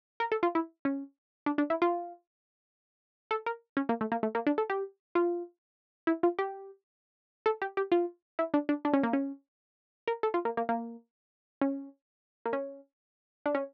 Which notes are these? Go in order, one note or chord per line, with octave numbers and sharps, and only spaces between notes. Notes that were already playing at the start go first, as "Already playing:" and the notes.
A#4
A4
F4
E4
C#4
D4
D4
E4
F4
A4
A#4
C#4
A#3
A3
A#3
A3
A#3
D4
A4
G4
F4
E4
F4
G4
A4
G4
G4
F4
E4
D4
D4
D4
C#4
A#3
C#4
A#4
A4
F4
A#3
A#3
A#3
C#4
A#3
C#4
D4
C#4